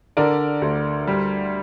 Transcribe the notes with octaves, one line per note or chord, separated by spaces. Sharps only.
D3 A#4 D5
D2
G3